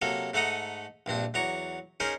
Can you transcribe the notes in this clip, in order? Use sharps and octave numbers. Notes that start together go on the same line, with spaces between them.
C3 F#3 A#3 A4
G#2 A3 A4 F#5 A#5 D#6
A#1 G2 C4 D4
E2 F#3 A#5 C#6 D6
C#4 D#4 G#4 A#4 C5